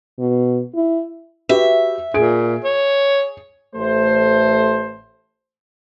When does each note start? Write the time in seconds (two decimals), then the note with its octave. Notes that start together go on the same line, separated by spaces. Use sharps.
0.19 B2
0.75 E4
1.49 F#4 G4 B4 E5
2.14 A#2 G#4 D7
2.64 C#5
3.74 A1 A3 C5